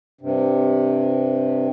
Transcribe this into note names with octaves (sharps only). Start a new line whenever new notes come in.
G2 C3